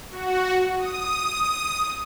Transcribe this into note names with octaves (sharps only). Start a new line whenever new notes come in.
F#4
D#6